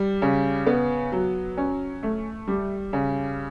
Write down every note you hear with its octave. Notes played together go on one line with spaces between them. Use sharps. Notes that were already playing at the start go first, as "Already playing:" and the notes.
Already playing: G3
C#3
B3
F#3
C#4
A3
G3
C#3